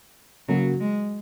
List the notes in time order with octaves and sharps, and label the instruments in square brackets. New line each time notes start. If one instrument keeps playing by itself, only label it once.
[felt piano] C#3 A#3 F#4 [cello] F#3
[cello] G#3